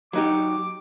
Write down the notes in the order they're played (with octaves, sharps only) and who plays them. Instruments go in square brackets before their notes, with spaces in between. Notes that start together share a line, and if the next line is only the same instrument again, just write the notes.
[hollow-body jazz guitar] F#3 D#4 G4 [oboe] D6